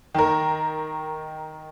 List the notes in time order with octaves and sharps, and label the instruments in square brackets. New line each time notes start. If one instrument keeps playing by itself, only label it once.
[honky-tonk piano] D#3 A#4